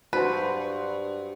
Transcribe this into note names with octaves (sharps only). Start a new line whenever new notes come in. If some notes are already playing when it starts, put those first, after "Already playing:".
G2 F#4 B4 C5